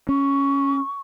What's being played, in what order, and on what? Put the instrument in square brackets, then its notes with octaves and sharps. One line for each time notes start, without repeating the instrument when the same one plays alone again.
[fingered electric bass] C#4 [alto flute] C#6